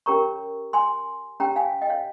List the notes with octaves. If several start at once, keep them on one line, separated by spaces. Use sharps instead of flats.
C#4 G4 A#4 C#5 A#5 C#6
G#5 C6
C#4 G4 C#5 G5 A#5
F5 G#5
D#5 G5
C#5 F5